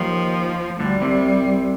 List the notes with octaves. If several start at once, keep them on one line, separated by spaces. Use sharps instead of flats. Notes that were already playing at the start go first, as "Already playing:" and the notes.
Already playing: D#2 D#3 F3
D2 D3 G3
C2 C3